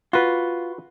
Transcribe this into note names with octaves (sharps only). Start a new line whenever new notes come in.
F4 F#4 B4